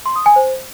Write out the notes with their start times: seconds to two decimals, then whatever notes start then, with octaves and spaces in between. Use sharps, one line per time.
0.06 C6
0.16 D#6
0.26 G#5
0.36 C5